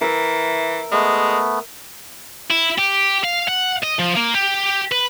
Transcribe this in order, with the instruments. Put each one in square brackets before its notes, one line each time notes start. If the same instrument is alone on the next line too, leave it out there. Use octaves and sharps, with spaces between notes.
[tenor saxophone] E3 [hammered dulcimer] A#4 E5
[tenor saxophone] G#3 [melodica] A3 B3
[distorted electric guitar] E4
G4
F5
F#5
D#5
F3
A#3
G4
B4